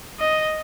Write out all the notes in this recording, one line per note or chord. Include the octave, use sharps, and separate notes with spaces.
D#5